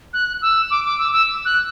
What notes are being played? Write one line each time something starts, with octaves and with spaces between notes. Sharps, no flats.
F#6
E6
D6
D6
E6
E6
F#6